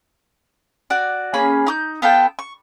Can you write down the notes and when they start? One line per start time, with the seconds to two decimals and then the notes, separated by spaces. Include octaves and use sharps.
0.90 F#4 D5
1.34 A#3 C#4 G#4 B5
1.66 D#4 D6 G6
2.02 B3 F4 A4 G5
2.39 C#6